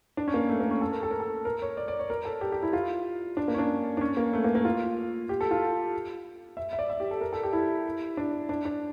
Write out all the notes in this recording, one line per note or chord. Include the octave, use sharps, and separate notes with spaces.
D4
C#4
A#3
A3
A#3
C#4
A4
A#4
A4
A#4
A4
A#4
C#5
D5
D5
C#5
A#4
A4
G4
G4
E4
F4
D4
A#3
C#4
D4
D4
C#4
A#3
A3
A#3
A#3
F4
G4
A4
F4
E5
E5
D5
E5
G4
A4
A#4
A4
G4
E4
D4
D4
D4